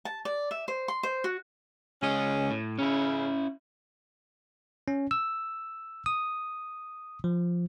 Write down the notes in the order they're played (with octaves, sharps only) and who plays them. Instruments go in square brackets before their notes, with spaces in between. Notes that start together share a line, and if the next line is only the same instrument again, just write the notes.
[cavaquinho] A5
D5
E5
C5
C6
C5
F#4
[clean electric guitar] C#2 G#4 D#5 [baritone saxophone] C#4
[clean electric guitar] A2
[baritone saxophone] C#3 [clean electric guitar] C#4 E4
[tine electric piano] C#4
E6
D#6
F3